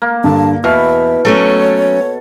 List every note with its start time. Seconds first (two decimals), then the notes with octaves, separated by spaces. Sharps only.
0.02 A#3
0.24 G2 D3 A5
0.64 E2 B2 E5 F6
1.25 F#3 A3 C#4 A4 C#5